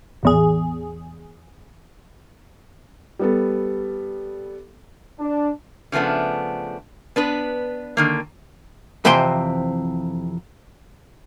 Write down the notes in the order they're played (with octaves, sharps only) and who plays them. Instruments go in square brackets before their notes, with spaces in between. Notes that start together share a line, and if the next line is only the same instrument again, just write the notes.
[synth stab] A1 E2 G#4
[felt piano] G3 B3 A4
[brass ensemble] D4
[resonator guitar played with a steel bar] C#3 F3 A3 B3 D4
B3 D4 B4
D3 D#3 A#3
[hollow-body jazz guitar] F2 C3 E3 C5 G5 C6